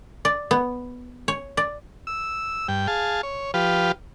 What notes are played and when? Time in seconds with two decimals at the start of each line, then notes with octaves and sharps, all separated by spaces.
0.25 D5
0.51 B3
1.28 C#5
1.57 D5
2.07 E6
2.68 G2 G5
2.87 G#4 F5 A5
3.23 C#5
3.54 F3 G4 B4 F5